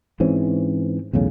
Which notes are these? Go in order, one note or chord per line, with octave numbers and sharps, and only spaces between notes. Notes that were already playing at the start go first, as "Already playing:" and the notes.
G#2 E3 C4 C#4
B1 E2 A2 C#3